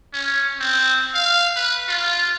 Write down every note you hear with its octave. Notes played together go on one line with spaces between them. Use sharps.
C#4
C4
F5
B4
F4